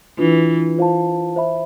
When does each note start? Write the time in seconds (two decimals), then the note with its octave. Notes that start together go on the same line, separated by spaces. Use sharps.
0.18 E3 D4 F4 B4
0.78 F4 C5 F5 A5
1.36 C5 E5 B5